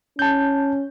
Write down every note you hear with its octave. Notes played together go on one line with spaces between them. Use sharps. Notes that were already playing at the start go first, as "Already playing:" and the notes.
C#4 A5 G6